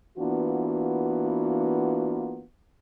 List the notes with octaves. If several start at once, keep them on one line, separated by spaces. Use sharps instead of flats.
E3 A#3 B3 D4 F4 F#4